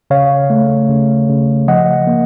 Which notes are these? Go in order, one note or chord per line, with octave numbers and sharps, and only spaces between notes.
C#3 C#5 F5
A3
C#3
C#3
F3 D#5 F#5
A#3